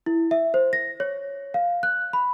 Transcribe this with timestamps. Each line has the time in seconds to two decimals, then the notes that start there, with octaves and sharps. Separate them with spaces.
0.06 E4
0.31 E5
0.54 C5
0.73 A#6
1.00 C#5
1.54 F5
1.83 F#6
2.13 B5